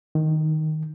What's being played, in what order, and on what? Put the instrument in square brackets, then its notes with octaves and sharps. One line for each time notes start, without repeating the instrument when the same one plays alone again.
[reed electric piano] D#3